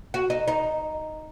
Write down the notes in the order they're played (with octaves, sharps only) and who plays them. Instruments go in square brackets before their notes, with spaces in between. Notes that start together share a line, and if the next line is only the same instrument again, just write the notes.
[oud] F#4
D#4
D#4